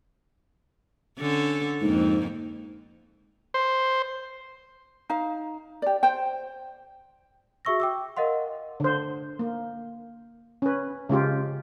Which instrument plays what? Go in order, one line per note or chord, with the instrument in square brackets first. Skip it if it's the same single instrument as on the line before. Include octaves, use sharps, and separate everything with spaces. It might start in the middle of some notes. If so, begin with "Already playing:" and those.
[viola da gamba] D3 C#4 A4
[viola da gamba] F2 A#3 [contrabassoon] G#2
[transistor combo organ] C5
[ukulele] D#4 F5
G4 D5
C5 G5
[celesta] F#4 G#4 E5 C#6 E6 A#6
G5 D6 E6
A#4 D#5 F5 F#5 C6
[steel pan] D3 C5
A#3
C#4 B4
C#3 G#3 F4 G4